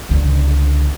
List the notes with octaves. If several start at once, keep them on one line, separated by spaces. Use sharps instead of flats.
C#2 D3